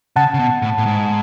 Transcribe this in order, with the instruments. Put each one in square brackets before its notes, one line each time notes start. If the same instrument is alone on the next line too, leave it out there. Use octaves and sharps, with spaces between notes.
[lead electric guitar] C#3 [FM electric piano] F#5 A5
[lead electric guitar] C#3
B2
A2
A2
G#2